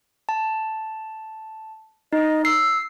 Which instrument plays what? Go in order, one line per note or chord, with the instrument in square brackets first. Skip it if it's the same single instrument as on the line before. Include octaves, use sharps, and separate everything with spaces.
[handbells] A5
[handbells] D#4 [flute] D#5
[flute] E6 [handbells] C7